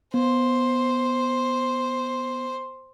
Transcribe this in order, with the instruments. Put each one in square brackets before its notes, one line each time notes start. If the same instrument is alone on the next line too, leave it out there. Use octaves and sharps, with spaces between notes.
[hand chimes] B3 [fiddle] C5